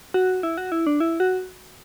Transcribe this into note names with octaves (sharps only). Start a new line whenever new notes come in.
F#4
E4
F#4
E4
D4
E4
F#4